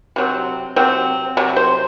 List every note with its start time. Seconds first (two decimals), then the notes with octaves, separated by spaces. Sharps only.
0.16 C3 F#3 C4
0.76 C3 F#3 C4
1.37 C3 F#3
1.56 C5